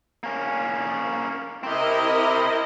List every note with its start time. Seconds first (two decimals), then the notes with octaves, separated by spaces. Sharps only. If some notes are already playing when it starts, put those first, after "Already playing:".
0.24 A#3 C#4
1.64 C4 E4 G4 A#4 D#5